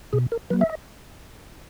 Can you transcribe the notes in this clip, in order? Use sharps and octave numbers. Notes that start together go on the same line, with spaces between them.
B2 G#4
A#4
F#3 A#3 B4
E5
D#5